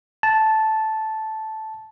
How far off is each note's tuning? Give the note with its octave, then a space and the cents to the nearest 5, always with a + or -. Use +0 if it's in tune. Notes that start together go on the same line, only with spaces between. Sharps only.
A5 -10